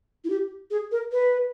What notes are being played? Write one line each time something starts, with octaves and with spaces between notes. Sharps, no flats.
E4
G4
G#4
A#4
B4